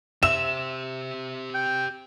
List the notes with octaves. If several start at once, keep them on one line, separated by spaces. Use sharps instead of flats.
G4 C5 E5 E7
G5